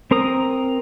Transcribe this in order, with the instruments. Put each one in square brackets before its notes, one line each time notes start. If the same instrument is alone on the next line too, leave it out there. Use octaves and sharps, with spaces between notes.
[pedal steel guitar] C4 A#4 A#5 D#6